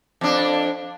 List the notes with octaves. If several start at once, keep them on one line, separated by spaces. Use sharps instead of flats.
F2 D4